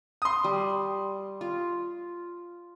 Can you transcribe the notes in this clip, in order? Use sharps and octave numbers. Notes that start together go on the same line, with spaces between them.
C6 D#6
G3
F4